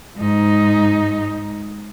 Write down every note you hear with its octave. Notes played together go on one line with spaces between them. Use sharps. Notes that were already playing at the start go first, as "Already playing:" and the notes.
G#2 D#4